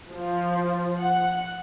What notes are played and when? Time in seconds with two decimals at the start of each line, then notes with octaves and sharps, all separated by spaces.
0.11 F3
1.00 F#5